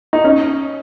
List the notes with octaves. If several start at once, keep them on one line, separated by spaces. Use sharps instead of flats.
D#4
C#4